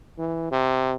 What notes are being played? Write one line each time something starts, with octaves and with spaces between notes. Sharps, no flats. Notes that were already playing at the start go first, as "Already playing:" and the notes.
E3
C3